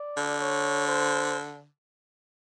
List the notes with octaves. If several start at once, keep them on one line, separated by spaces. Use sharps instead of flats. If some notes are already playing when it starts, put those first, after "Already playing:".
Already playing: D5
D3
C#5
C5